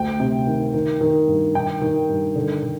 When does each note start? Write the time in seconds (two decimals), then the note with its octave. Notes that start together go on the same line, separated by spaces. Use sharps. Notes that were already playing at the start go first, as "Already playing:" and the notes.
Already playing: D2 G5
0.20 C3
0.47 D#3
0.74 D#3
1.01 D#3
1.28 G2
1.55 D#3 G5
1.81 D#3
2.09 G2
2.36 D3
2.63 D3